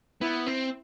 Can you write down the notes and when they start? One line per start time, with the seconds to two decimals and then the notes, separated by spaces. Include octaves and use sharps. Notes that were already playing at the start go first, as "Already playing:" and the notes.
0.21 B3 E4
0.47 C4